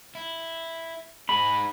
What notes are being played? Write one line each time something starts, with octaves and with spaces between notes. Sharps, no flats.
E4
D#4 G#4 B5